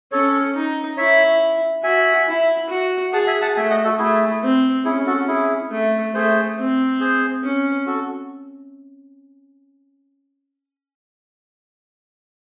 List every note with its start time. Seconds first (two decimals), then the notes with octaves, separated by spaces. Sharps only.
0.12 C#4 A4 C#5
0.55 D#4
0.97 E4 C#5 E5
1.84 F#4 E5 G#5
2.28 E4
2.70 F#4
3.13 G#4 F#5 A5
3.27 E5 G#5
3.42 F#5 A5
3.56 A3 E5 G#5
3.70 D#5 F#5
3.85 F#4 A4
3.99 A3 E4 G#4
4.43 C4
4.85 C#4 E4 G#4
5.06 F#4 A4
5.28 E4 G#4
5.71 A3
6.14 A3 G#4 C5
6.57 C4
7.00 G#4 C5
7.43 C#4
7.86 F#4 A4